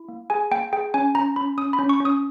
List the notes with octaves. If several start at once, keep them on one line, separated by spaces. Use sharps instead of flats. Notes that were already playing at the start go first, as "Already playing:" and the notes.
Already playing: E4
A#3
G#4 G#5
A#3 G5
G#4 G5
C#4 G#5
C#4 A#5
C#4 B5
C#4 D#6
B5
C#4
C#6
C#4
D#6